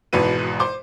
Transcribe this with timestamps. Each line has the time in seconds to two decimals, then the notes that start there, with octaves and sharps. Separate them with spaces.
0.13 G#1 G#2 B2 E3 B4 D#7
0.60 C5 C6 D6